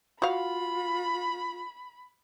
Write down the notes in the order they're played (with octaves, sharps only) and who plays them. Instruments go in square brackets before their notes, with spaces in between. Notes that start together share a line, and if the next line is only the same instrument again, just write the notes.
[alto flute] F4 [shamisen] F#4 F5 [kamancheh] B5